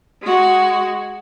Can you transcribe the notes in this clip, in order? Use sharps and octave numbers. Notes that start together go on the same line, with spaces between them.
G#3 F#4